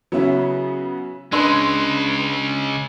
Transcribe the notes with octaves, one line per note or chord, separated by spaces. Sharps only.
C#3 F#3 B3 C#4 E4
C#3 G#3 D4 B4 C6 E6